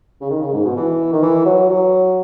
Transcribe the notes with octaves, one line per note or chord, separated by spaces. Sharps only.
C#3
D#3
C#3
G#2
B2
E3
D#3
E3
F#3
F#3